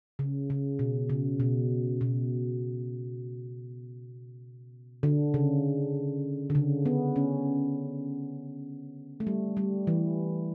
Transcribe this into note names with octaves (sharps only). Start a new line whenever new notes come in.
C#3
C#3
B2
C#3
B2
B2
D3
C#3
D3
C#3
B3
C#4
A3
G3
G3
E3